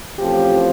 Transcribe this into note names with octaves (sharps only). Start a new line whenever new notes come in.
A1 A2 F3 C4 G4